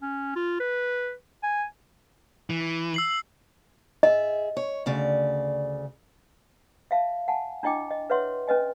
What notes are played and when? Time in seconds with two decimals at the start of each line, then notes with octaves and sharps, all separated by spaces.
0.02 C#4
0.36 F4
0.60 B4
1.43 G#5
2.50 E3
2.94 E6 C7 F#7
4.03 G#4 D#5 E5
4.57 C#5
4.86 D2 C#3 D5
6.91 E5 F5 A5
7.28 F#5 G#5 A5
7.63 D4 E4 D#5 G5 D6
7.91 D#5
8.10 B4 C#5 E5 F#5 C6
8.48 C#4 B4 D#5 G#5